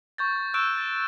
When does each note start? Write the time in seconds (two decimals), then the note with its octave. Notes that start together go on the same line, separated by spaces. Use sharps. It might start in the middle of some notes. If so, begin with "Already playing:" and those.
0.18 C#6 G6 A6
0.54 C#6 E6 F#6 D7 E7
0.78 A6